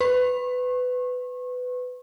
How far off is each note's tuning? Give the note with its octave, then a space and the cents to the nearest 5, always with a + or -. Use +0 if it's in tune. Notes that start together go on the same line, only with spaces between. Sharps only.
B4 +20 C#6 -35